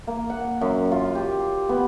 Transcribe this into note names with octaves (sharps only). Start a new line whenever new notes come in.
A#3
F#5
F#2
F4
G4
B3